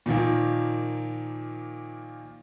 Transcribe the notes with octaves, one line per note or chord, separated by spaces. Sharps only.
A#2 D#3 F3 A#3